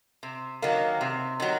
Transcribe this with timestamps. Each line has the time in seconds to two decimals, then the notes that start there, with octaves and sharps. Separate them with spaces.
0.23 C3
0.62 D#3 F#3 A#3
1.01 C3
1.40 D#3 F#3